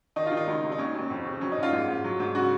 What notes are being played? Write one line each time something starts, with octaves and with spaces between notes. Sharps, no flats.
D#3 D#4
F4
D#3
D#4
C#2
C#2
D#4
D#2 C#4
D#2
F2
C#3
F#3 C#4
D#4
F#2
F4
G#2
G#2
F#3
G#2
C#3 F#4